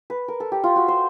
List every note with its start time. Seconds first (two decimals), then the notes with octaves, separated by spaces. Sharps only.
0.10 B4
0.28 A#4
0.40 A4
0.52 G4
0.64 F4
0.76 F#4
0.88 C5